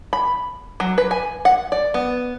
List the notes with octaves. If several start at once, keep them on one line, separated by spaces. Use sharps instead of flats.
B5
F#3
B4
G#5
F#5
D5
B3